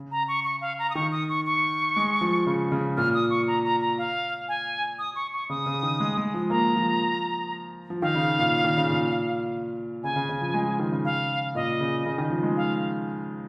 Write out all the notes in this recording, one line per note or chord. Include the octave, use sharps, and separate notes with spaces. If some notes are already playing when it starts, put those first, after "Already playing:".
Already playing: C#3
A#5
C#6
C#6
F5
A#5
D#6
D#3 C#6
D#6
C#6
C#6
G#3
F3
C#3
C#3
A#2 F6
D#6
C#6
A#5
A#5
A#5
F5
G#5
D#6
C#6
C#6
C#3 D#6
C#3
D#3
G#3
G#3
F3
A#3 A#5
F3
F3
D#3 F5
C#3
A#2
D#3
C#3
A#2
C#3 G#5
C#3
C#3
F3
G#3
F3
D#3
C#3
F5
A#2 D#5
C#3
C#3
D#3
F3
G#3
F5